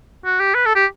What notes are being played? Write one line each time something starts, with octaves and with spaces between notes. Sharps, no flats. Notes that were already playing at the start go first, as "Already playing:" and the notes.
F#4
G4
B4
A4
G4